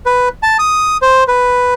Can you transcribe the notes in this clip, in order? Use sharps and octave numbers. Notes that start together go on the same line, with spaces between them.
B4
A5
D#6
C5
B4